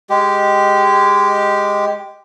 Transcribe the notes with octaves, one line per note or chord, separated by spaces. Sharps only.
G#3 G4